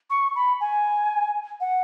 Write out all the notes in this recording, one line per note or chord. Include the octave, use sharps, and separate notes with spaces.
C#6
B5
G#5
F#5